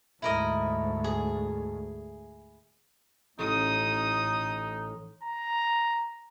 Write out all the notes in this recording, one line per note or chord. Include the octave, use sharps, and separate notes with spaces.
D2 G#2 E4 A#4 D#5
G#4
A1 A2 D#4 D#6
A#5